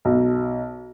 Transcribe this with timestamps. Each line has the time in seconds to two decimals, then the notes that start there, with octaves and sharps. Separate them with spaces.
0.05 B1